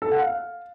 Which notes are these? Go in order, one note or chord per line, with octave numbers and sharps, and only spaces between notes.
A4
F#5
F5